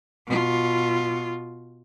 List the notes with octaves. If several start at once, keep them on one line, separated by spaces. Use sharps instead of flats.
B2 F4